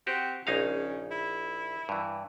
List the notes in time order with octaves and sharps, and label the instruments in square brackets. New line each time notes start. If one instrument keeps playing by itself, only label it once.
[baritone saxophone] C4 [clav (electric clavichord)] F#4 G4
[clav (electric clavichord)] A#1 D#4 F5 [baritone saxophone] C#3
[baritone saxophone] E4
[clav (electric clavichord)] G2 E3